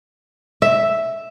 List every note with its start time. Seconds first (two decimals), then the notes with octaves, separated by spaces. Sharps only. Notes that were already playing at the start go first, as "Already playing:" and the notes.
0.62 E5